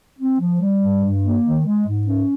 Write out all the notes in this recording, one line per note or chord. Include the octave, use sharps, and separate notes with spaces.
C4
F3
G3
G2
G2
A#3
D#3
G#3
G#2
C#4